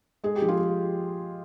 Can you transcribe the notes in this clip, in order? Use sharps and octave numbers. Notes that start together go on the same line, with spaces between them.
G#3 G#4
G4
F3
F4 G#4